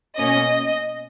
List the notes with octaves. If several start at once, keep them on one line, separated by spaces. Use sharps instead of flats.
B2 A#3 C#4 D#5